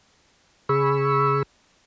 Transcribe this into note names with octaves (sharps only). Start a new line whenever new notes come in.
C#3 G#4 B5 C#6 E6